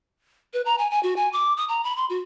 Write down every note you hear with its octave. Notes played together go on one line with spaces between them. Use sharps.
B4
A#5
G#5
G#5
F#4
G#5
D6
D#6
A#5
B5
C6
F#4